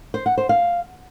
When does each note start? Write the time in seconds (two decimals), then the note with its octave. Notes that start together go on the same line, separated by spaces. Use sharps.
0.14 C5
0.26 F#5
0.38 C5
0.49 F5